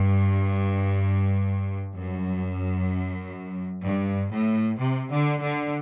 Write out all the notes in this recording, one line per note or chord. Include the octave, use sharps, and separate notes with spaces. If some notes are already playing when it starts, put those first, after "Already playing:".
Already playing: G2
F#2
G2
A2
C3
D3
D3